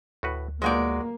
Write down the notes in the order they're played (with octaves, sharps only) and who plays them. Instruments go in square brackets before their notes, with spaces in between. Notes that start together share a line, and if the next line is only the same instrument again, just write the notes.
[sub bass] D2 [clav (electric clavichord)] A2 F#4 B4
[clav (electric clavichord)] B1 A#2 G5 [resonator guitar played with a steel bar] G#3 F#4 D5 [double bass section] A#3